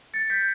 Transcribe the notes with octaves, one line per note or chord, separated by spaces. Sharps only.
A6 C#7
G6 B6